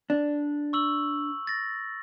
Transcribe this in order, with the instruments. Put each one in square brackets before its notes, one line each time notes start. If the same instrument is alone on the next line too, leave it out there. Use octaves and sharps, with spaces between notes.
[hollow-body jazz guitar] D4
[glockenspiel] C#6 E6 F#7
A6 A#6